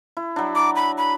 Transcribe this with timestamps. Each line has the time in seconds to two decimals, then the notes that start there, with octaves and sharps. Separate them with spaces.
0.17 E4
0.36 F#3 D4
0.55 D6
0.76 B5
0.98 B5